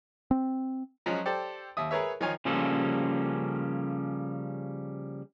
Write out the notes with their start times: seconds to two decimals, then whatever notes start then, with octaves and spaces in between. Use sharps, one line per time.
0.31 C4
1.06 F3 F#3 G#3 C#4
1.26 G4 A4 C5 D5 A5
1.77 D#2 E5 D#6
1.91 G#4 A#4 B4 C#5 E5
2.21 D#3 F3 F4 C#5 G#5
2.45 C#3 F3 G3 A#3 C#4 A4